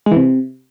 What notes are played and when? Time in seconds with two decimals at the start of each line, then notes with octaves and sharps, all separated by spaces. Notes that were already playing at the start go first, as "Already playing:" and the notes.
0.06 G#3
0.11 E3
0.16 C3